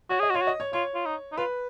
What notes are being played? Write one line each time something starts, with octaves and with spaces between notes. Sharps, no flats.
F#4 C#5
G#4 D#5
F#4
F4 C#5
F#4
D#5
C#5
F4 C#5
F4
D#4
D#4
F4 B4